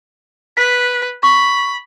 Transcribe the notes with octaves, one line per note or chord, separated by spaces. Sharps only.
B4 B6
B5 C#6